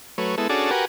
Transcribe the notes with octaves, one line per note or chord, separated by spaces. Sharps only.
F#3 A3 B4 C#5
G#3 B3 E4 A4
C#4 D4 F#4 G#4 A4 D5
F#4 G4 A#4 B4 F#5 G#5